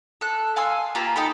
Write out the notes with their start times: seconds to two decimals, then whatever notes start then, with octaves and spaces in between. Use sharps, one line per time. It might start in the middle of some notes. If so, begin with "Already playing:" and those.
0.21 A4 F#6
0.56 F5 G#5 C6 E6
0.95 A#3 F4 G4 B4
1.16 D#4 G4 A4 B5